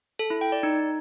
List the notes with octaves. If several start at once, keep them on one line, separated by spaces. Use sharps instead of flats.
A4
E4
G5
D5
D#4